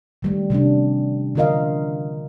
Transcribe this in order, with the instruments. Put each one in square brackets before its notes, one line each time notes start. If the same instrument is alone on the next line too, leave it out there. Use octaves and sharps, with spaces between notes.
[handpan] D#3 G3 A3
C3 G3 C#4 D4
D3 E3 F4 A#4 D#5 F5